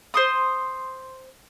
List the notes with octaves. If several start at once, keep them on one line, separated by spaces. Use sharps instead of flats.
C5 C6 D#6